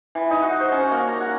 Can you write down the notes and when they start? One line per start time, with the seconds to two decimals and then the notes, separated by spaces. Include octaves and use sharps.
0.15 E3
0.30 D#4
0.42 F#4
0.60 C5
0.72 C#4
0.91 A#3
1.08 A#5
1.20 F#5